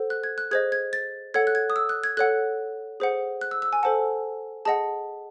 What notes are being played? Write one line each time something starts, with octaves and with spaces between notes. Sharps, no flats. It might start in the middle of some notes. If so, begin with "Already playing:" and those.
Already playing: A4 C5 F#5
F#6
G#6
F#6
G#4 C5 D#5 G#6
G#6
A6
A4 C#5 F#5 G#6
F#6
G#6
D#6
E6
F#6
G#6
A4 C#5 F#5 F#6
G#4 C5 F#5
F#6
E6
E6
G#5
A4 C5 F#5 A5
G#4 D#5 F#5 A5